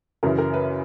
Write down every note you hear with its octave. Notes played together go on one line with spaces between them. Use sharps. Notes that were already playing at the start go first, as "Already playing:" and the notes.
F#2 C#3 E3 A#4
A#4
B4